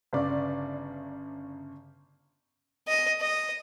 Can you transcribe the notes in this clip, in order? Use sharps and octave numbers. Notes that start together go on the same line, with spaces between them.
G1 C#3 D5
D#5
D#5